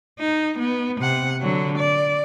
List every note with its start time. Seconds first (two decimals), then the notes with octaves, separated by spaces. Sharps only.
0.20 D#4
0.59 B3
1.01 C3 F#5
1.41 D3 F#3
1.78 D5